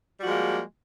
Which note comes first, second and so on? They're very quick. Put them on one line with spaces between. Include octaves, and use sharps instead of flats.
G3 F#4 F3 G#3 A#3